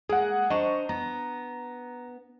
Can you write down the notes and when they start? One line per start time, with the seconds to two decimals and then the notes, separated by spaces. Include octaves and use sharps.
0.09 G#3 A#3 G#4 F#5
0.50 D4 C5 D#5 A#5 C#6
0.89 B3 A#5